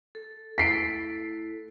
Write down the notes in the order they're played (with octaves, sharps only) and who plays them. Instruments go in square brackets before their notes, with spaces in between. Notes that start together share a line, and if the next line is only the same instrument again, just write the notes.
[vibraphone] A4
[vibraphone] A3 E4 A4 [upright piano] B6 C7 D7